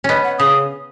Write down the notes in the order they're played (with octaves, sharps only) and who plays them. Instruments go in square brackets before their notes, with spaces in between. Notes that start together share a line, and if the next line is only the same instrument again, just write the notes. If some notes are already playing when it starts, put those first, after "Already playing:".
[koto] B3 C#4 [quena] D#5
[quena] F#5
[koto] C#3 [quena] D#6